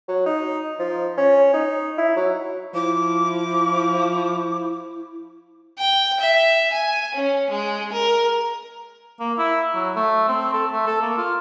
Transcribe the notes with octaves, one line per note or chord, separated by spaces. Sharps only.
F#3
D#4
F3
C#4
D#4
E4
F#3
F3 E4 D6
G5
E5
G#5
C#4
G#3
A#4
A#3
E4
F#3
A3
C4
A4
A3
A4
A#3
F4